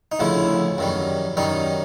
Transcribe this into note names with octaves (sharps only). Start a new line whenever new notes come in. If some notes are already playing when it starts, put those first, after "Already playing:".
D#4
D2 C#3 F3 E4
F#2 D#3 G3
F#2 D#3 G3 D#4